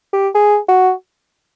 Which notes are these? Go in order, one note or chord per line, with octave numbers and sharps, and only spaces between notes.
G4
G#4
F#4